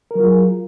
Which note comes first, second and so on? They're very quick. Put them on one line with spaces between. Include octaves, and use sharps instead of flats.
A#4 F#3 F4 G#4